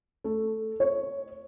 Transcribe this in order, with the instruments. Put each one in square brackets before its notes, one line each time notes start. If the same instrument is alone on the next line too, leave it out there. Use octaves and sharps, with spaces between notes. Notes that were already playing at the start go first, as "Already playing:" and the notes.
[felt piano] A3
C#5